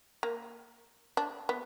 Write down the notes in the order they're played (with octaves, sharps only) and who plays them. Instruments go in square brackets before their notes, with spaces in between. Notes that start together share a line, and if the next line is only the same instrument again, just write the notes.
[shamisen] A#3
D4
B3